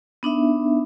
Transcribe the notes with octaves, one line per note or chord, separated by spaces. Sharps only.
B3 D4 D#4 E5